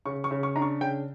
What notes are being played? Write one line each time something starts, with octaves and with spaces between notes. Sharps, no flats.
C#3 C#6
C#6
C#3
C#6
D4 A#5
C#6
C#3 G5